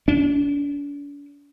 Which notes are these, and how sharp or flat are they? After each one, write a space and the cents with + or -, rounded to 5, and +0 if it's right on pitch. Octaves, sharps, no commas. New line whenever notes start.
D4 -45